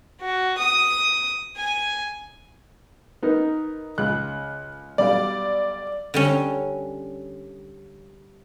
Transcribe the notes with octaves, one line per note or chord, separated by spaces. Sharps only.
F#4
D#6
G#5
B3 D#4 A#4
C#2 F#6
B1 G3 D5 F5
D3 G3 C#4